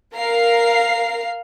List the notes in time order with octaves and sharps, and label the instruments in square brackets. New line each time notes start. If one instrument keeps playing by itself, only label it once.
[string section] A#4 F5 C7